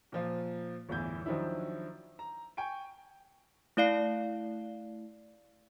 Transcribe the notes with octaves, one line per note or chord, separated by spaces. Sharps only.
A#2 F3 F4
G1 E2 A2 E3 G6 G#6
D#3 F3 F#3 D4 E4
A#5
G5 G#5 C#6 D7
A3 E4 D5 F5 C7